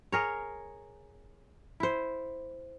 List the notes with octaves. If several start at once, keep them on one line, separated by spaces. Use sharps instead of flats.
G#4 A#4 C#5
E4 C5